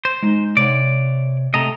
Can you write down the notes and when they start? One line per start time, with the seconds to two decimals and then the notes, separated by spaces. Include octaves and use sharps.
0.05 C5
0.23 G#3 D#4
0.57 C3 C#5 D5 F#5
1.54 C3 A3 D#5 A5 A#5